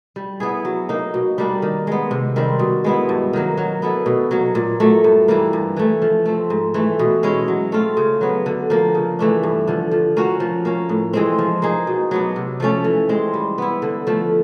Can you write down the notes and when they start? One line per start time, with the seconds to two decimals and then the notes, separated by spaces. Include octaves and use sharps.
0.16 G3
0.40 B3 E4 G#4
0.65 F#3
0.89 A#3 D#4
1.14 B2
1.38 G3 A#3 D4
1.62 D#3
1.87 G#3 B3
2.11 C3
2.36 D#3 G3 C4
2.59 B2
2.84 G#3 B3 E4
3.09 G2
3.33 D#3 F#3 A#3
3.58 F#3
3.82 B3 E4 A4
4.06 B2
4.31 F#3 A#3
4.55 A#2
4.80 F#3 A3
5.04 G2
5.28 E3 G3 A#3
5.53 G2
5.77 E3 A3
6.02 F3
6.26 A3 C4
6.50 G#2
6.74 E3 A3
6.99 B2
7.23 G#3 C#4 E4
7.48 F#3
7.72 A3 C4 F4
7.97 C#3
8.21 F#3 B3
8.46 D3
8.70 F3 A#3
8.95 C#3
9.19 E3 A3 D4
9.43 G2
9.67 D3 F3
9.91 F3
10.17 A#3 C#4 F#4
10.40 F3
10.65 A#3 C#4
10.89 A2
11.13 E3 G#3 C4
11.38 F3
11.62 A#3 D#4 G#4
11.87 B2
12.11 F#3 B3 D4
12.36 C3
12.60 F3 A3 C#4
12.84 E3
13.09 G#3 C4
13.34 G3
13.58 B3 E4
13.82 D3
14.07 F3 A3